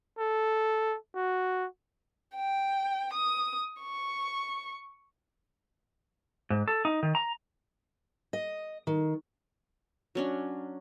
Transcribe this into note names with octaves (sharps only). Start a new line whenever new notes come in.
A4
F#4
G5
D#6
C#6
G#2
A4
D#4
D#3
A#5
D#5
D#3
F#3 C#4 D4